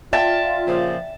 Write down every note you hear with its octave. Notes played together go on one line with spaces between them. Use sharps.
F4 D5 E5 G5 A5
A#2 C#3 F3